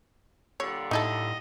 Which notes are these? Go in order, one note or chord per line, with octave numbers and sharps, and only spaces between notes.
A#2 D3 G3 C#5
A2 D#4 E4 A4 D#5